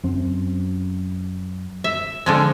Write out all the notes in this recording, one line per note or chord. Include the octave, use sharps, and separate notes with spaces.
F#2 C4
E5
D3 F3 G#3